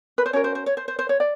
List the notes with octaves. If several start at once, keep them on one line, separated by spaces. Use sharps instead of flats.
B4
C5
C#4 F#4 A#4 C#5
C5
C5
C#5
C5
C5
C5
C#5
D5